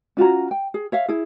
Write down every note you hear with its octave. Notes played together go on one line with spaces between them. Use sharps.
C#4 F4 F#4 A#5
G5
G#4
C#5 E5 F5
E4 G#4